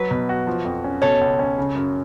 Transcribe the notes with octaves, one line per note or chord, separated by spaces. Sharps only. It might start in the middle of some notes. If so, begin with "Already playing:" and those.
Already playing: F#3 B4
B2
F#4
F3
F2
C#4
B2 A4 C#5
C#2
C#4
C#3
F#2